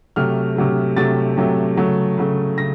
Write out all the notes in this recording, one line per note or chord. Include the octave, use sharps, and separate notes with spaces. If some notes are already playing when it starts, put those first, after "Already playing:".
C3 F#3 A3 F6
C3 F#3 A3
C3 F#3 A3 A6
C3 F#3 A3
C#3 F#3 A3
C#3 F#3 A3
C#3 A#6